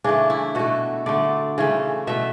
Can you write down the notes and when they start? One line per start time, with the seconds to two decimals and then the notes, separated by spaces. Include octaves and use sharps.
0.04 C#3 E3 A3 D4
0.30 E4
0.55 B2 A3 F#4
1.06 D3 A3 D5
1.58 C#3 E3 A3
2.07 B2 A3 E5